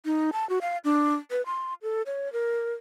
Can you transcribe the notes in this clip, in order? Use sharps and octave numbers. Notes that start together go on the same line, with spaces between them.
D#4
A5
F#4
F5
D4
B4
C6
A4
C#5
A#4